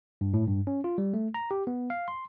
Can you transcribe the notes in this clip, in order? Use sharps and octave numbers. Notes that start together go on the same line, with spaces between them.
G2
A2
G2
C#4
F4
G3
A3
A#5
G4
B3
F5
C6